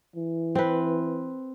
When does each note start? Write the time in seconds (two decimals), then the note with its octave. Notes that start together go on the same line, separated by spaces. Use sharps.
0.16 E3
0.55 C4 B4